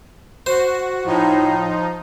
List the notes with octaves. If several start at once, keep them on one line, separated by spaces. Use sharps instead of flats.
F#4 C5
A2 F3 D#4